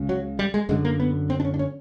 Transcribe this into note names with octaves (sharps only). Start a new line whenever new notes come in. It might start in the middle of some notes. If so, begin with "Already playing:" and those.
Already playing: C#2 C#3
F#3
G3
G#3
F#2 D3 G#3
A#3
B3
C4
D4
C#4
D4
C#4